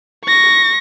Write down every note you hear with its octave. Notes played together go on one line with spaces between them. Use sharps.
C#6 A#6